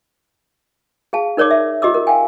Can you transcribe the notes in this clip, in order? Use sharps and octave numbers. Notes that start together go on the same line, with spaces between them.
G#4 F5 A5
D#4 A#4 C#5 D5 D6
E5
F4 G4 D#5 D6 E6
A#4
F5 G5 G#5